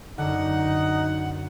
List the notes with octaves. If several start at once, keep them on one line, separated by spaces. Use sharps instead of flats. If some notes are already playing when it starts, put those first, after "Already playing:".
F#2 D3 D#4 F#5